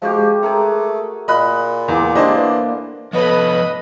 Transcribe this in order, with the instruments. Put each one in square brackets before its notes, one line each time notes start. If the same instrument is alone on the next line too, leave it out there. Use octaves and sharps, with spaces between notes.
[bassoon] F3 [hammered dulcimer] G#3 F#4 G4
[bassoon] A3 [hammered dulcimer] G#4 A#4 A#5
[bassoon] A#2 [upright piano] D#5 B5 F#6
[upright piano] E2 [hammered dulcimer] A#3 C6 D6
[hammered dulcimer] A#2 D3 [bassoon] G3 [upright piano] D4 C5 D#5
[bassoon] E3
[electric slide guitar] F3 B3 C#5 [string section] A4 B5 [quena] B4 [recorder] D#5